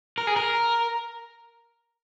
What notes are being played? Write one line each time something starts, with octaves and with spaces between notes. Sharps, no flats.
A#4
G#4
A#4